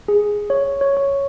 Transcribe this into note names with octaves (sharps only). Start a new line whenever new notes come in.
G#4
C#5
C#5
C#5